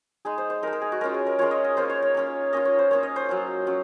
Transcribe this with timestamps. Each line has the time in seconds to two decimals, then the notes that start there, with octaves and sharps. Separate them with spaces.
0.25 G#3 D#4 G#4
0.38 C5
0.50 C5
0.63 G#3 D#4 A#4
0.73 A#4
0.82 G#4
0.92 F#4
1.01 G#3 C#4 F4 A#4
1.14 G#4
1.26 A#4
1.39 G#3 C#4 F4 C#5
1.51 D#5
1.64 D#5
1.77 A#3 C#4 F4 C5
1.90 C#5
2.02 C#5
2.15 A#3 C#4 F4
2.53 A#3 C#4 F4 D#5
2.65 C#5
2.79 C5
2.91 A#3 C#4 F4 C#5
3.03 D#5
3.16 C5
3.29 F#3 C#4 F4
3.67 F#3 C#4